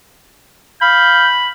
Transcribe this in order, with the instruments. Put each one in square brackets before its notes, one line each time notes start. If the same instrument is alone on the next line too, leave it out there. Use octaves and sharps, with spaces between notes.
[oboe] F5 [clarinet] B5 [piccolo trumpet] G6